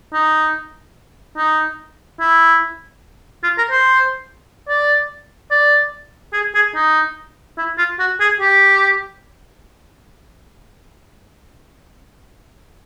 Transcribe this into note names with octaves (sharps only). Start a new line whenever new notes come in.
D#4
D#4
E4
F4
A#4
C5
D5
D5
G#4
G#4
D#4
E4
F4
F#4
G#4
G4